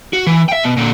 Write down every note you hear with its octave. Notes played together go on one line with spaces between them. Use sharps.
F#4
E3
E5 G5
B2
A#2 D3